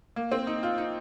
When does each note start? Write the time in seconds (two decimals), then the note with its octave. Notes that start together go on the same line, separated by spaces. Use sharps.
0.16 A#3
0.32 C4
0.47 D#4
0.63 F4
0.78 D#4